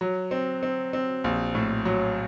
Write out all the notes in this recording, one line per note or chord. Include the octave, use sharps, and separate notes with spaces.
F#3
C4
C4
C4
A#1
A2
F#3